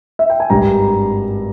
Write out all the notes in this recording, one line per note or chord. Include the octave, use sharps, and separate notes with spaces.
E5
G5
G#5
G#1 G2 G3 A#5